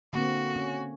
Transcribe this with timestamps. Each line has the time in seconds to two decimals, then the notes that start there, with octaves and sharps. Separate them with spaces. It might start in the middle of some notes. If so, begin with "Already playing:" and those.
0.13 D3 A#3 C4 F#4
0.56 C#4